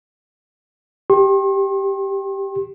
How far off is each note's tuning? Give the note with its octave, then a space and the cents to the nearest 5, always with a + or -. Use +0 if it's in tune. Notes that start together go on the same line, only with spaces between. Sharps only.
G4 +0 C6 +45